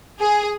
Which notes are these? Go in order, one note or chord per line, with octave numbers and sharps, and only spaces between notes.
G#4